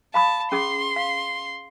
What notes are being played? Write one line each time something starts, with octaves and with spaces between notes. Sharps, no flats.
F5 A5 B5 D#6
C#4 G#4 C6 D#6
F5